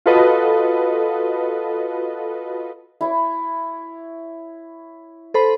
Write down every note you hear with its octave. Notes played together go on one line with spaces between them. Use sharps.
F4 F#4 A4 B4 D#5
E4 C#5
A4 C5 B5